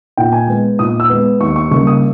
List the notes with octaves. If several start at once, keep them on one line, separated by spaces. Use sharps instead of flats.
A#2 G5
G#5
G#3 B3
A#2 D#6
E6
G#3 B3
D#2 C#6
C#6
C#3 G3 A#3 C#6
D#6